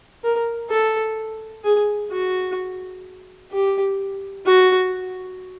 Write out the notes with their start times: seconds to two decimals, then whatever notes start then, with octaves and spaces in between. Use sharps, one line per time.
0.24 A#4
0.70 A4
1.64 G#4
2.11 F#4
3.52 G4
4.46 F#4